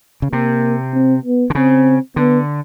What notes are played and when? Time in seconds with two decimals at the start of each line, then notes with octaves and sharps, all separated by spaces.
0.22 C#3
0.32 C3 A#3
0.94 C4
1.25 B3
1.50 D3
1.55 C#3 C4
2.16 D3 B3